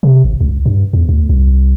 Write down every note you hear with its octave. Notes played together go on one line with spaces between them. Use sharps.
C3
G#1
C#2
G2
E2
D2
C2